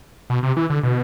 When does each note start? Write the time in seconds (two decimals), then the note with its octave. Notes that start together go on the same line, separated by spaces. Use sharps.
0.30 B2
0.43 C3
0.57 E3
0.70 D3
0.83 B2